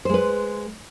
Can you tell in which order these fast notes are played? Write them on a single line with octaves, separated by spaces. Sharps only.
C5 G#3 B4